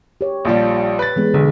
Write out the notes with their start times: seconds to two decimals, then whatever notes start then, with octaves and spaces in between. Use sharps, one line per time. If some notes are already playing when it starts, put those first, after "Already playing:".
0.21 G4 C#5
0.45 A#1 F3 G3
0.99 B4 A6
1.16 E3 G#3 B3
1.34 B1 D3